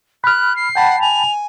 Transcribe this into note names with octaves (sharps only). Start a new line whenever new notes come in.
B5 F6 F#6
C7
F#5 G5 A5 B5
G#5 F7